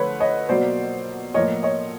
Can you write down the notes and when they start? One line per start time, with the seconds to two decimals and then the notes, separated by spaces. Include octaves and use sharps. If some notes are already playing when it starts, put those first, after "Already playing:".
Already playing: D3 F3 A3 B4 C#5
0.20 C#5 D#5
0.49 B2 F#3 A#3 C5 D5
1.34 A2 F3 A#3 C#5 D#5
1.63 C#5 D#5